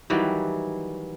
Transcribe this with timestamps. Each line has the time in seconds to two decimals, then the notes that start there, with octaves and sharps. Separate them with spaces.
0.10 D#3 E3 F#3 G3